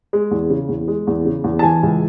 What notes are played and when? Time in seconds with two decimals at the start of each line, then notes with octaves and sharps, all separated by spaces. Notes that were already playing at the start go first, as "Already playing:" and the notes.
0.13 G#3
0.31 E2
0.50 C#3
0.69 E2
0.88 G#3
1.07 E2
1.25 C#3
1.44 E2
1.59 A5
1.63 E3 G#5
1.83 C#2